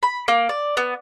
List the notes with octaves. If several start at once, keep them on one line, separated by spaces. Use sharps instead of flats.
B5
A#3
D5
B3